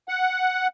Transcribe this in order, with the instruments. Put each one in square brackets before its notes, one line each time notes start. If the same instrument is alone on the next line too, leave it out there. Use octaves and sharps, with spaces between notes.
[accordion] F#5